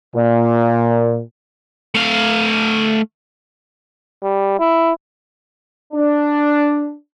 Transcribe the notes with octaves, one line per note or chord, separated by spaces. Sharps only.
A#2
A3 F5
G3
E4
D4